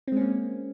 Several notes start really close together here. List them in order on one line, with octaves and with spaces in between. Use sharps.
C4 G#3 C#4 A#3